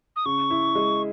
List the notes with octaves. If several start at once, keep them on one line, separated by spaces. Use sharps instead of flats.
D#6
C#3 C#6
E4
G#3